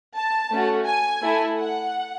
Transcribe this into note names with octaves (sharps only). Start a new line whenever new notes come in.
A5
A3 C#4 F#4
G#5
A3 E4 A4
F#5